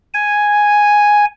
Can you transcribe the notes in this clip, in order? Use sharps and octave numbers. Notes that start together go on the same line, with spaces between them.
G#5